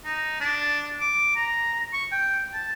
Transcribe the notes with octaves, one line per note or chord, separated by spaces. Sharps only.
D#4
D4
D6
A#5
C#6
G5
A5